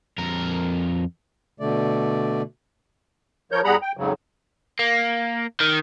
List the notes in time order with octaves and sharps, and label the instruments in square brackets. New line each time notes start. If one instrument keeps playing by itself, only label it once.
[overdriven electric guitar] F2 A#4
[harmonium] B2 D3 A3 D5
[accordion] F3 A#4 C#5 G6
E2 G3 G#4 F#5 A#5 B5
G5
F2 G#2 C#3 F#3
[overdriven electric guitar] A#3
D#3